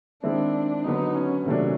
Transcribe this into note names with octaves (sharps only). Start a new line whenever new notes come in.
D#3 G#3 C4 D4 E4
D3 F#3 B3 D#4
C#4
C3 D#3 F#3 A3 C#4 D4